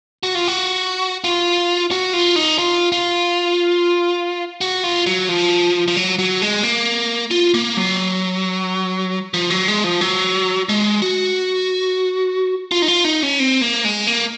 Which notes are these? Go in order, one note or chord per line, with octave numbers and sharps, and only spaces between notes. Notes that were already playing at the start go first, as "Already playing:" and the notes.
F#4
F4
F#4
F4
F#4
F4
D#4
F4
F4
F#4
F4
F#3
F3
F3
F#3
F#3
G#3
A#3
F4
A#3
F#3
F3
F#3
G#3
F3
F#3
G#3
F#4
F4
D#4
F4
D#4
C#4
C4
A#3
G#3
A#3